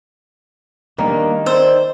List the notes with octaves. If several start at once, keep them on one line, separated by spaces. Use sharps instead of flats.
D#3 G3 A#3 D4
C5 D5 E6